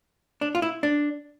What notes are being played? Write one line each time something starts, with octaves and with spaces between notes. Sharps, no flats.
D4
F4
E4
D4